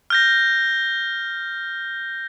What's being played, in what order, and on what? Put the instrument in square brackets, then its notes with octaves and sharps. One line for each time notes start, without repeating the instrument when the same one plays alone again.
[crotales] F6 G6 A#6